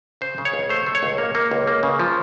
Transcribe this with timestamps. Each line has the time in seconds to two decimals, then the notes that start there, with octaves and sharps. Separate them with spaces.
0.21 C#3 C5
0.38 C#3
0.45 C#5
0.53 C#2
0.70 A3 C5
0.86 A3
0.95 C#5
1.03 C#2
1.18 A#3
1.35 A#3
1.51 C#2
1.67 A#3
1.83 C#3
1.99 F3